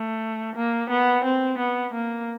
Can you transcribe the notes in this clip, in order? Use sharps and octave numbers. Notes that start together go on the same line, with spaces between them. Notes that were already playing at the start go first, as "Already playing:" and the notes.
Already playing: A3
A#3
B3
C4
B3
A#3